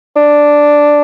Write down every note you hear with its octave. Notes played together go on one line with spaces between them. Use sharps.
D4